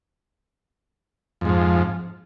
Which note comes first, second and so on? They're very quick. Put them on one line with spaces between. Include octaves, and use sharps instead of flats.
F2 G#2 F3